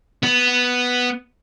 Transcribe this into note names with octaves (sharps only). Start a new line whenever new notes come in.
B3